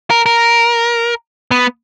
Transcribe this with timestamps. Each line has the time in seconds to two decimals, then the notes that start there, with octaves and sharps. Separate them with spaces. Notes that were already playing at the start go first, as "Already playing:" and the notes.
0.10 A#4
0.26 A#4
1.51 B3